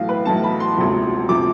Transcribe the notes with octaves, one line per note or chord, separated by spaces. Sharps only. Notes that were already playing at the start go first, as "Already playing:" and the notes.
Already playing: B1 A2 E3 F5
B4
B1 A2 E3 A5
B5
C6
E1 D2 C3 F3
C3 F3 D6